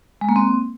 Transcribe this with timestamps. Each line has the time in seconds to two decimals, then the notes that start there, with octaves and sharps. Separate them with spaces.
0.21 G#3
0.29 A#3
0.36 C4